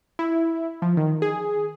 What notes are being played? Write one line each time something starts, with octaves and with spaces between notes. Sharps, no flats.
E4
F3
D#3
G#4